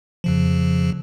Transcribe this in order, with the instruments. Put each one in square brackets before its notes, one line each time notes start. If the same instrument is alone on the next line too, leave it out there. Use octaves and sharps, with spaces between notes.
[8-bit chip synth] F2 C#3 F3